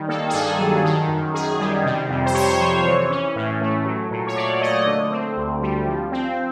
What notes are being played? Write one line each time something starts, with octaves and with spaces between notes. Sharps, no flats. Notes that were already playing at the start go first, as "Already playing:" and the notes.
Already playing: D#3 G3
A#3 A4
G#4
G2 A4
F#3
D#3
F#2
F#2 G#4
G3
C3
F2
C5
F2 C#5
F3
E3
C#4
A2
A3
F#3
A#2
C#5
A#2 D5
A3 D#5
D3
C4
D2
G3
F3
C4